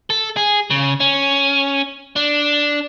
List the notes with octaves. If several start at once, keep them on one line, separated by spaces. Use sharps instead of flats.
A4
G#4
C#3
C#4
D4